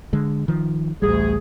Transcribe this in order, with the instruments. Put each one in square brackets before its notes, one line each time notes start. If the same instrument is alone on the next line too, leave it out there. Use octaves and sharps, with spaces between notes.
[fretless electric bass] D3 G#3
D#3 F3
[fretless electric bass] A1 G3 [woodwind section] D2 G#4